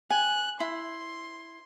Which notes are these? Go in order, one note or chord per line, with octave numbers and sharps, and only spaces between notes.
G#5 F#6
E4 C6